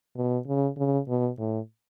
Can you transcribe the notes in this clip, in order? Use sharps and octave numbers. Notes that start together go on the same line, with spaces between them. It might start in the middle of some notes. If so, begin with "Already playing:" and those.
B2
C#3
C#3
B2
A2